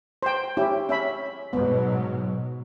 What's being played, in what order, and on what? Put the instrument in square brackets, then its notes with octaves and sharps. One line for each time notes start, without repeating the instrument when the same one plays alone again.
[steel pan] C5 G5
C#4 E4 G4
C#4 E5 B5
[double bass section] G#2 B2 F#3 [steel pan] B3